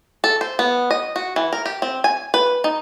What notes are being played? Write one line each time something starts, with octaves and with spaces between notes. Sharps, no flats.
A4
C5
B3
D#5
F#4
E3
A#4
G4
C4
G#5
B4
D#4